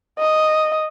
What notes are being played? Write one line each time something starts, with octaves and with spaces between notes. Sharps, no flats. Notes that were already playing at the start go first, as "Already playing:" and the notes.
D#5